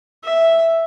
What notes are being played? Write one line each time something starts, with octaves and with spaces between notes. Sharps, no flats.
E5